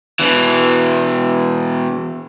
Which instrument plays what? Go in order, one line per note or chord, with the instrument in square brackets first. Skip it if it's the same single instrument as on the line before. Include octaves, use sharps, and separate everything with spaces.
[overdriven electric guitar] B2 E3